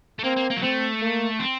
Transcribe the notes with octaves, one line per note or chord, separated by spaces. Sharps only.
A3
A#3 C4
A#3
A#3
F#3
A3 C4
A#3
C4